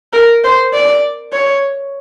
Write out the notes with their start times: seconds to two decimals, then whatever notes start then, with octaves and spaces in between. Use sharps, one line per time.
0.13 A#4
0.44 C5
0.73 D5
1.33 C#5